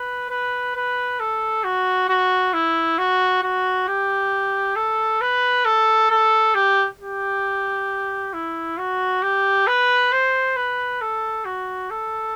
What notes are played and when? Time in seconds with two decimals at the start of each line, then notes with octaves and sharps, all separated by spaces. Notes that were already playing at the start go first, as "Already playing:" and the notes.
Already playing: B4
0.30 B4
0.76 B4
1.20 A4
1.64 F#4
2.09 F#4
2.54 E4
2.98 F#4
3.43 F#4
3.88 G4
4.76 A4
5.21 B4
5.65 A4
6.10 A4
6.54 G4
7.00 G4
8.33 E4
8.78 F#4
9.22 G4
9.67 B4
10.12 C5
10.56 B4
11.01 A4
11.45 F#4
11.90 A4